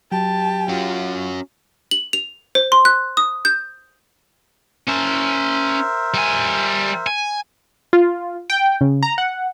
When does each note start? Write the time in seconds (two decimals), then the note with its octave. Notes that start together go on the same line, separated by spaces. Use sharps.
0.12 F#3 G4 A5
0.69 C#4 F4 F#4
1.91 F#7
2.13 F7
2.55 C5
2.72 C6
2.85 F#6
3.17 D#6
3.45 G6
4.87 C#4 A#4 C5 E5 A5
6.14 G3 G#5
7.07 G#5
7.93 F4
8.50 G5
8.81 C#3
9.03 A#5
9.18 F#5